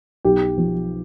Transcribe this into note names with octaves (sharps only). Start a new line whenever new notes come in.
B1 G4
F3